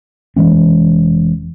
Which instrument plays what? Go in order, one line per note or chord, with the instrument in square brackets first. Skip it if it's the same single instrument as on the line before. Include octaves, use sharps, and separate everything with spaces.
[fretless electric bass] F1 E3 G#3 C#4